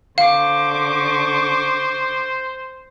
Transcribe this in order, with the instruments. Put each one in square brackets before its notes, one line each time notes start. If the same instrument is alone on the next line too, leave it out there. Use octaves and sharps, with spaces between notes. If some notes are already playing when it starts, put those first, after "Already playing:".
[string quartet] D3 C#6 D6 [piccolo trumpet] C5 [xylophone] F5